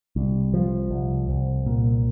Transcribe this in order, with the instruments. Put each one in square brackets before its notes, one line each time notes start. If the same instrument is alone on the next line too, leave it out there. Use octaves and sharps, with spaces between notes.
[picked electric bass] C2
F3
C2
C2
A#2